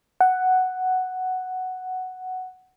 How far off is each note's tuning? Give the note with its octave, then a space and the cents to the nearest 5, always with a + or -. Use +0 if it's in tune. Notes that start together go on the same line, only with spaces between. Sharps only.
F#5 +5